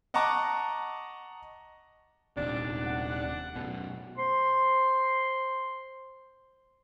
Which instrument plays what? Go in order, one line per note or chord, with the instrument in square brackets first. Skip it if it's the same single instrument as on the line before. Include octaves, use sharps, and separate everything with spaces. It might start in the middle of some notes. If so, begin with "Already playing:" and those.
[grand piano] D#5 F#5 A5 A#5 C#6 D6
[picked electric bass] D#1 D#2 C3 [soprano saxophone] D4
[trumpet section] F#5
[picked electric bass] F#2 B2
[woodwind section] C5 C6